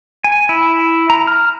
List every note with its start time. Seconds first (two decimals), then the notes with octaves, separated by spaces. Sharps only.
0.24 G#5
0.49 E4
1.10 A#5
1.27 F6